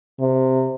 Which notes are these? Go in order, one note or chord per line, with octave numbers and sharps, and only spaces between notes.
C3